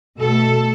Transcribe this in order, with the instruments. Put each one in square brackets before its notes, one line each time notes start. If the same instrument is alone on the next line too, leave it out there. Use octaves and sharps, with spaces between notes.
[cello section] B2 A3 A4